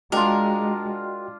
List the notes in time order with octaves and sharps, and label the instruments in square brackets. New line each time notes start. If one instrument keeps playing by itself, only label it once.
[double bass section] G#3 [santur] D4 F4 [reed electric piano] F#4 D#5 G5 [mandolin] A#4